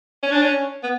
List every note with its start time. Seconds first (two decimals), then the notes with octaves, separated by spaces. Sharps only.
0.23 C#4
0.32 D4
0.42 C#4
0.83 B3